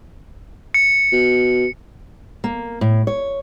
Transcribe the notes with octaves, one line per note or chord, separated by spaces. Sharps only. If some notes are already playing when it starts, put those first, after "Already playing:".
C#7
B2
A#3
A2
C#5